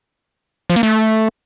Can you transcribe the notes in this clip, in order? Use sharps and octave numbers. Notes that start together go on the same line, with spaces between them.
F3
A#3
A3